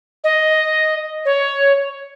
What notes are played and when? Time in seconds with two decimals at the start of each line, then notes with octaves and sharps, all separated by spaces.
0.24 D#5
1.25 C#5